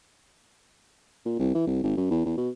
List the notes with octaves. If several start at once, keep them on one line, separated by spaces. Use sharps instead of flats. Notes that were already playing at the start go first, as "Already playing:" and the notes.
A#2
C2
E3
C2
G#1
F#2
E2
E2
B2